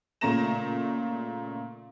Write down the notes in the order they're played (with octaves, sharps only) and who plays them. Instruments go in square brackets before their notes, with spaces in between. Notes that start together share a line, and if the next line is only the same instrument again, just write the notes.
[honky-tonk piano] A#2 C#3 A3 A#5 A#6 E7